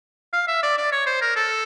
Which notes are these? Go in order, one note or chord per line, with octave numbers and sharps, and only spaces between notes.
F5
E5
D5
D5
C#5
C5
A#4
A4